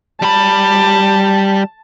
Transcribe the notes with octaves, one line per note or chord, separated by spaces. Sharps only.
G3 A5 B5